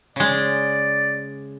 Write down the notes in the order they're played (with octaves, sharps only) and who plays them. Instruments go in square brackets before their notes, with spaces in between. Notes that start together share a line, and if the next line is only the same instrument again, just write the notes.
[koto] C#3 G#3 [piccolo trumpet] D5